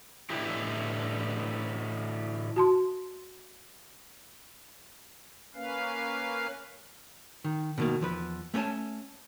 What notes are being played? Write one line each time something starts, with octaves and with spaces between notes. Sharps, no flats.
A2 D3 E3 E4 G4
F#4 A5 C6
A#3 C#4 B4 F5
D#3
B2 D#3 A#3
E2 F3 B4
A3 C#4 A#4 G#5 A5